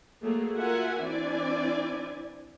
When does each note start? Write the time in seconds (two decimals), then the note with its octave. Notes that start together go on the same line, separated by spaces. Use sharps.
0.22 F#3 A3 A#3 G#4 A4
0.56 F4 F#4 A#4 E5 F#5 G#5
1.02 E3 C4 D4 E4 D5 G#5